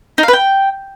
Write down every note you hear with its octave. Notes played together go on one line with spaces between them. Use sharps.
D#4
F5
B4
G5